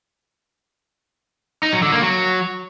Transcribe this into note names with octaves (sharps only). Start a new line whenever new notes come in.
D#4
F#3
D3
A#3
F#3